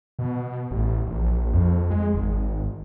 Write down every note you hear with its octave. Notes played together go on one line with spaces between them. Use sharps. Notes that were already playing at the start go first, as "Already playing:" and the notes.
B2
A1
A#1
F2
G#3
G#1